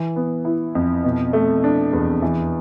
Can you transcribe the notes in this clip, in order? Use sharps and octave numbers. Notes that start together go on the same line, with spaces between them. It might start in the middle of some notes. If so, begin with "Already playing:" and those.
Already playing: E3
B3
E4
F2
B2
A3
D4
E2
E3